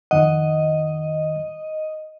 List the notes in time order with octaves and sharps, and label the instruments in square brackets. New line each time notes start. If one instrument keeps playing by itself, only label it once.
[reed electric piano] F2 D#3 F#5 [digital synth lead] D#5